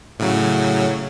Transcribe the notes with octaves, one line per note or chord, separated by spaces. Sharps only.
A2 C#3 F#3